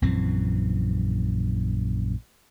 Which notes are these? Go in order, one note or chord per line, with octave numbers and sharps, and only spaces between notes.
A#1 F#2 E3 C4